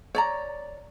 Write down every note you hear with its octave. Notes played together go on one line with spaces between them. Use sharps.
C#5 D5 A#5